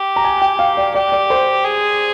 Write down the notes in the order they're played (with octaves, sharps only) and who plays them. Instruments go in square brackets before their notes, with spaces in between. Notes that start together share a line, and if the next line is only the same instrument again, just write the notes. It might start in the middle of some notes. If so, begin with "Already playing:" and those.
Already playing: [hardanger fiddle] G4
[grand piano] A#5
G#5
G5
F5
D5
[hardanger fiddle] G4 [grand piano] D5
[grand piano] D5
C5
[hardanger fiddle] G#4